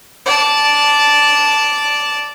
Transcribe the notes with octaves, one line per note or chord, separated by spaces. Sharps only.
D5 A5